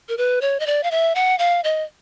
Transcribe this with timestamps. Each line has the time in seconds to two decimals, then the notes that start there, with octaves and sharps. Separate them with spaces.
0.09 A#4
0.17 B4
0.41 C#5
0.60 D#5
0.67 D5
0.83 F5
0.91 E5
1.15 F#5
1.39 F5
1.64 D#5